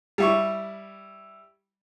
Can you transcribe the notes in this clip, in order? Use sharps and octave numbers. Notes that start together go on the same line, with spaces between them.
G3 E4 C#6